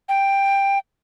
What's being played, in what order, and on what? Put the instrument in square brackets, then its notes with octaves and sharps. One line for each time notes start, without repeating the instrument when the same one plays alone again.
[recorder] G5